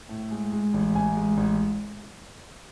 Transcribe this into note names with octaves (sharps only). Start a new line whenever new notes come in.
A2
G#3
G#3
A1
A1 G#5
G#3
A1